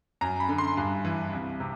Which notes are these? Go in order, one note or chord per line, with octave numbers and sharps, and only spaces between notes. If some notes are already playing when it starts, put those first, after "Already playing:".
F#2 A#5
B5
D3
C6
G2 B5
E3
C2
C3